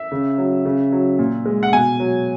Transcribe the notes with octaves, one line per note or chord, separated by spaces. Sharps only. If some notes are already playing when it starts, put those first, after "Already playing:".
Already playing: E5
C#3
F#3
C#3
F#3
A#2
G#3
F#5
B2 G#5
F#3